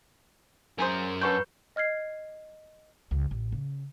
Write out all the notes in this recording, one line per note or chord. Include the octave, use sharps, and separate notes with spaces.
F#2 C#4 G#4 A#4 C5
D3 C#4 A4 B4 C#6 G6
D#5 F6 G#6 C7
C#2
A1
C#3